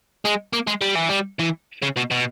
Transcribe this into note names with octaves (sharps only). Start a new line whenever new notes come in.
G#3
A#3
G#3
G3
E3
G3
E3
C#3
B2
B2